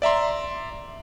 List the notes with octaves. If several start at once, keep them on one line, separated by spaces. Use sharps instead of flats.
D5 E5 A#5 C6